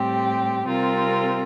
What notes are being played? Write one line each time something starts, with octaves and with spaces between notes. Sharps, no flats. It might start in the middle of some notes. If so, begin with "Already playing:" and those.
Already playing: A2 G3 C4 G4
C3 G3 C4 F4 A#4